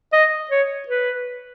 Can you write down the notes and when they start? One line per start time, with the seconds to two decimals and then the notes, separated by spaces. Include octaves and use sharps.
0.13 D#5
0.51 C#5
0.88 B4